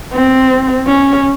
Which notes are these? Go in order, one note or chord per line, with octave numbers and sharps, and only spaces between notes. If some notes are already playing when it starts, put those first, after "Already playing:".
C4
C#4